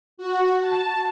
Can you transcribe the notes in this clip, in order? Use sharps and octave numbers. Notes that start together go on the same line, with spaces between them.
F#4
A5